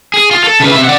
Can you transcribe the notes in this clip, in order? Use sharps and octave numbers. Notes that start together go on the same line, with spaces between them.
G#4
F4
A4
C#3 B4
C3 E5
D5 F#5